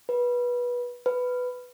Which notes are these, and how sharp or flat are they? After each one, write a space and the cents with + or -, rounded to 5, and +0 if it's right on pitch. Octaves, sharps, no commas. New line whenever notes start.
B4 -20
B4 +10